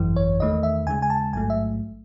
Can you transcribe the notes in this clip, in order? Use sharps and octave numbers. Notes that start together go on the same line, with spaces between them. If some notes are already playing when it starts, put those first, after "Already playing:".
Already playing: G#1 F#2 E3
C#5
E2 D#3 A3 D#5
E5
D#2 C#3 G#3 G#5
G#5
A5
A1 G#2 F#3 A3 G#5
E5